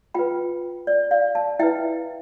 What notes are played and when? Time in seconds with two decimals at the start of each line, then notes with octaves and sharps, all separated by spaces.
0.14 F4 B4 G5 B5
0.87 D5
1.11 D5 F5
1.35 F5 A5
1.59 E4 B4 E5 G5